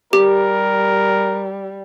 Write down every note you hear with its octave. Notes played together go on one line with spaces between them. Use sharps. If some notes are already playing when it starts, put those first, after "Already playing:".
G3 G4 A#4